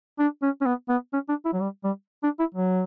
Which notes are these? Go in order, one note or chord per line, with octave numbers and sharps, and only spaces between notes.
D4
C#4
C#4
B3
B3
C#4
D4
E4
F#3
G3
G3
D4
E4
F#3